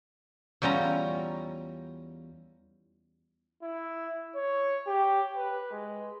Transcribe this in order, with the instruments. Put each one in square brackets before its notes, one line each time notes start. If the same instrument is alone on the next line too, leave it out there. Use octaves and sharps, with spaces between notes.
[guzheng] E2 G3 C#4 F4 A#5
[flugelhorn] E4
C#5
G4
B4
G#3